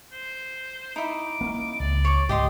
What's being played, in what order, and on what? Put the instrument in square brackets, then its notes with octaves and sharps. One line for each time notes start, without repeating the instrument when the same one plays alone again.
[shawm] C5
[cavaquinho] D#4 E4 [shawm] D6
[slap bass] A#3 C#4
[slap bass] C#2 [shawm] D5
[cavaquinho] C#5 D6
[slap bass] C#2 G#2 C3 [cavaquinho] G4 D#5 C6